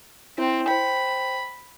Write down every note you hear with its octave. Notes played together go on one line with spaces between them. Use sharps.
C4 E4
C5 G5 B5